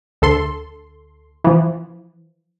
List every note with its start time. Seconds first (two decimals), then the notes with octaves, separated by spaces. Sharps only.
0.22 D2 A4 C6
1.44 E3 F3